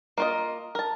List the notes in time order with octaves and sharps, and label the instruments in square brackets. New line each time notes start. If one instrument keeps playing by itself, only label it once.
[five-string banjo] A#3 F4 D#5
A#4 A5